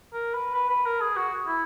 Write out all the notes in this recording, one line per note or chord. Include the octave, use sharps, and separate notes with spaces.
A#4
B4
B4
B4
A#4
G#4
F#4
E4